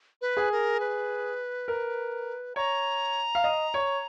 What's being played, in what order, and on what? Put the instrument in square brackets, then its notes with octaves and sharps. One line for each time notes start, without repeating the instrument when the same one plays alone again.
[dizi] B4
[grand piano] G#4
[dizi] A#4
B4
[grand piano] A#4
[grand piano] C#5 [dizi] A#5
[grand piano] F5
D#5
C#5